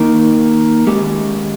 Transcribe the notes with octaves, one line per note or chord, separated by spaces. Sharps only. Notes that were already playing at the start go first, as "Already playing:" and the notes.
Already playing: D#3 A#3 D#4 A#4
D#3 G#3 C#4 G4